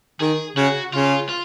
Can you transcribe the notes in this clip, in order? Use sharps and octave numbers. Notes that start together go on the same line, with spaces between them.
D#3 G#4
C#3 F#4
C#3 F4
F4